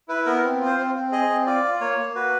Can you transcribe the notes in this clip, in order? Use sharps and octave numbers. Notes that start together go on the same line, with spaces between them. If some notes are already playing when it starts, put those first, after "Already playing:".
E4 B4
B3 A#4
C4
F4
C5
C4
C4
G#4 D#5
C4
F4 D5
F4
A#3 C#5
A#3
F#4 B4